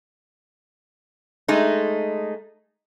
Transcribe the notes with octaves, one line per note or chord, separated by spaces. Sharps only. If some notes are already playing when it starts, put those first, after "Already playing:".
G#3 A3 D#4